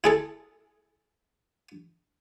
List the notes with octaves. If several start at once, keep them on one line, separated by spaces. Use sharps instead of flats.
E4 G#4 A4